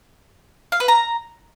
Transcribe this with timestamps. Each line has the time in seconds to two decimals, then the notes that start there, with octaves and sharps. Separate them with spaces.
0.72 F5
0.80 B4
0.88 A#5